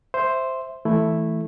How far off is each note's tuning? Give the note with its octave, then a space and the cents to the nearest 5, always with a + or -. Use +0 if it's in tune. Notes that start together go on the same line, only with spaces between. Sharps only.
C5 +0 E5 +0
E3 -20 A3 +0 E4 +0